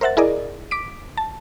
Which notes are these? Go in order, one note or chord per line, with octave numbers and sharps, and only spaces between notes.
A#4 C5 E5 F#5 A6
E4 G#4 A#4 D5 D#5
D6 B6 D7
A5